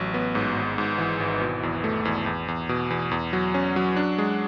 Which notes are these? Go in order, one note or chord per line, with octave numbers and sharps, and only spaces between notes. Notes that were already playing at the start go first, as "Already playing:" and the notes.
Already playing: A1 F#3
B3
G#2
G#1
G#2
E3
G#1
B2
E2
A3
E2
E2
E2
B2
E2
E2
F#3
C#4
F#3
D4
G#3